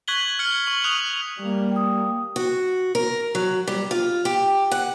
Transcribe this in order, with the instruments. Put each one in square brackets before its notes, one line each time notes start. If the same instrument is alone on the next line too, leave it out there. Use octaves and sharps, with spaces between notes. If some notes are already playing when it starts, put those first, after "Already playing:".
[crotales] C#6 F#6 G#6 B6 F#7 G7
F6 G#6 C#7 G7
C#6 F#7
C#6 D#6 F#6 F7 F#7
[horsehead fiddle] G3 A#3
[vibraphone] G5 D#6
[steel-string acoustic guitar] F#4
A#4
F#3
G3
F4
G4
F#5